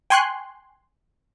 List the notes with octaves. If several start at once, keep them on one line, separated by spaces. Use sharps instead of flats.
G5 G#5 C6 C#6 F#6